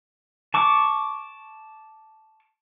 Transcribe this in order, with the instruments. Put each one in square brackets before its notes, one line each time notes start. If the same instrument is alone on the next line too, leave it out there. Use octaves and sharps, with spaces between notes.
[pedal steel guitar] A5 C#6 D6